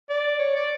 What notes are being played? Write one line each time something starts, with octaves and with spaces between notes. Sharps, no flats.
D5
C#5
D5